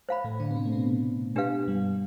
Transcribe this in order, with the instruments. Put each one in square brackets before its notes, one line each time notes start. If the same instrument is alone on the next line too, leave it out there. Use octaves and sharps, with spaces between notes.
[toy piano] C5 F5 B5
[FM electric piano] A2 A3
D3 D4
B3
C3 C4
A3
B2 B3
[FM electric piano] B2 B3 [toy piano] D4 G4 B4 F5
[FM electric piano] G2 G3